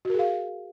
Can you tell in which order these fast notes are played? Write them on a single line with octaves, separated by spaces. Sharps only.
F#4 A#4 G#4 F5